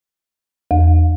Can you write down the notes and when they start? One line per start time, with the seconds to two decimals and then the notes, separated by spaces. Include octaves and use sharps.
0.71 E2